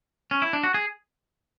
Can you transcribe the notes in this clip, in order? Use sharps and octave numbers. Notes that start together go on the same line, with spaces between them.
C#4
E4
D4
F#4
G#4